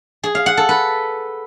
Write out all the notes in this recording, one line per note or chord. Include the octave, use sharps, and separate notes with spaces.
G#4
F5
F#5
A4
B4